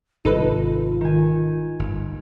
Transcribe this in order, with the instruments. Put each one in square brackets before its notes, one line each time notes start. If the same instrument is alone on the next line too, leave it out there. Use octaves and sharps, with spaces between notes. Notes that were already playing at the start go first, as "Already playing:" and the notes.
[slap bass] G#1 C3 G3 [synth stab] D#4 A4 B4 [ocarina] F4
[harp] D#3 G#5
[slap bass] G1 G2